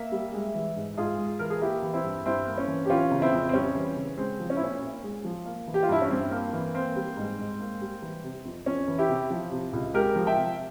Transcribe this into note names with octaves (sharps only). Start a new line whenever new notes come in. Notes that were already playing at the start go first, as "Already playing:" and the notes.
Already playing: A#3 E5
G3
G#3
E3
G#2
G#2 F4 G#4
G#3
E3 A#4
G#4
A#3 E4 G4
E3
C4 E4
G2
G2 C4 E4
A#3
C#4
E3
G4
E3 C#4 F4
C#3
C4 E4
F2
C4
G3 C#4
E3
C#3
G#3 C4
F3
C#4
E4
A#2 C#4
A#2
G#3
F3
A#3
E3
G4
F4
G2 E4
C#4
G2 C4
A#3
E3
A#3 C4
G3
G#2
G#2
A#3
G3
E3
C3
F2
F2 C#4
E3
E4 G4
C3
F3
C3
C#2
G#3 G4 A#4
F3
E5 G5
C3